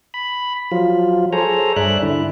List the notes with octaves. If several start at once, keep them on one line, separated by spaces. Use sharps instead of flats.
B5
F3 F#3 F4
G#4 A4 C5 C#5 A#5
G2 D5 E5 F#6
D3 E4